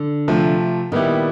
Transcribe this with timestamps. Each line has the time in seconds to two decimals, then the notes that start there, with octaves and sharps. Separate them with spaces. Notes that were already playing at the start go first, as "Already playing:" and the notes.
Already playing: D3
0.28 C3 F3 A3
0.92 A#2 D#3 G3 B3 E4 G4